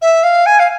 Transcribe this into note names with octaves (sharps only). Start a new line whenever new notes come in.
E5
F5
G#5
F5